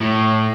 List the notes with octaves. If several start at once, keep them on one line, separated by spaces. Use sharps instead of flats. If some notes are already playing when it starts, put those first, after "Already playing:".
A2